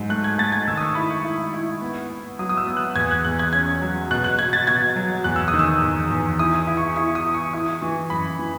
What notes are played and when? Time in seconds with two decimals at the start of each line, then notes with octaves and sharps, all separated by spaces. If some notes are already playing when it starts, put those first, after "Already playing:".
Already playing: G#2 F#3
0.09 A3 F#6
0.24 G#6
0.38 A3 A6
0.52 G#6
0.68 D#3 E6
0.77 D#6
0.82 C#6
0.95 E4 B5
1.10 C#6
1.24 E4
1.53 E4
1.81 B3
2.10 B3
2.39 F#3 D#6
2.49 D#6
2.57 E6
2.67 B3
2.77 F#6
2.96 E2 G#6
3.11 F#6
3.25 E2 F#6
3.39 G#6
3.53 C#4 G#6
3.82 F#3
4.11 B2 F#6
4.24 F#6
4.38 B2 G#6
4.53 A6
4.67 B2 G#6
4.96 F#3
5.24 E2 F#6
5.36 E6
5.48 D#6
5.53 D#3
5.59 E6
5.81 E2
6.11 E2
6.39 E4 D#6
6.67 E4
6.77 C#6
6.96 E4 C#6
7.15 D#6
7.25 E4
7.34 C#6
7.53 E4 D#6
7.82 E3 C#6
8.10 F#2 B5
8.39 E3